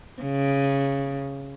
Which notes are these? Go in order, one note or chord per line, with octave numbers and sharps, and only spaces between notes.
C#3